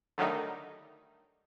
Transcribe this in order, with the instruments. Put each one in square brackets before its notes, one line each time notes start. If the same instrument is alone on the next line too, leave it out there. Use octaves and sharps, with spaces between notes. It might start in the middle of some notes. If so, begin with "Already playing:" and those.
[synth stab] D3 D#3 F#3 G3 A3 D#4